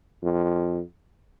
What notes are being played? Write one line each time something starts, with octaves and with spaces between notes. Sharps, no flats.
F2